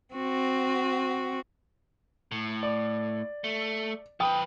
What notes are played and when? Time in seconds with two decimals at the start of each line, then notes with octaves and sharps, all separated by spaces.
0.14 C4 F#4
2.31 A2
2.63 D5
3.44 A3
4.20 F3 B4 G5 D#6